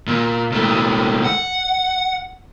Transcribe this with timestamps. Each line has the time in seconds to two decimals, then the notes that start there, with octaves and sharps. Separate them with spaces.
0.07 A#2
0.52 A#2 A3
1.24 F#5